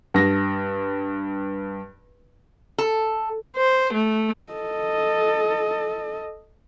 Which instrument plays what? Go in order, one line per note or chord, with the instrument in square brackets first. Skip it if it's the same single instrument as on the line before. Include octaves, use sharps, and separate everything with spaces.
[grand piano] G2 A#6
[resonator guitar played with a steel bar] A4
[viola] C5
A3
[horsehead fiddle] A4 D#5